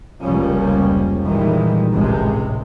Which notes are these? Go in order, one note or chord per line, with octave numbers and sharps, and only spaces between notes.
F1 C#2 F3 G3 A#3 C#4
A#2 D#3 E3 G3 G#3
G#1 C#2 A2 C3 G#3